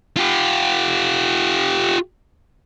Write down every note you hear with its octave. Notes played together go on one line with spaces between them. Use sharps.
F4 G4